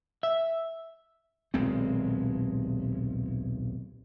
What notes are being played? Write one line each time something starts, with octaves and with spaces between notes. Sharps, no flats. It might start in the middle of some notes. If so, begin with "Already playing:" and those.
E5
D#1 B1 G#3 C4